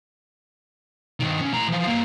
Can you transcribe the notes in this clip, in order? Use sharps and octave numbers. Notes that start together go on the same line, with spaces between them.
G2 D#3
B1 C#4
A2 A#5
E3 F3
G2 A#3